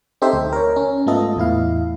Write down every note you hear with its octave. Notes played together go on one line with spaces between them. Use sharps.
C4 D#4 G4 A4 C5 E5
D2
A#4 C#5
C#4
G#2 A3 B3 F4 A4 D#5
E2 A2 E4 F5